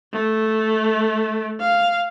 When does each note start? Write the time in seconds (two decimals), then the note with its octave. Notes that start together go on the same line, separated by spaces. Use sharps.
0.13 A3
1.61 F5